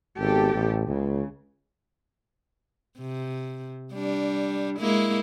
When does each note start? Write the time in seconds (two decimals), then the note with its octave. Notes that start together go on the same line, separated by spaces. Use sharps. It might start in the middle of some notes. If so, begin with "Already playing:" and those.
0.19 G#1 B3 G4 A4
0.53 A1
0.87 C#2 C#3
2.99 C3
3.93 G3 D4
4.79 G#3 A#3 E4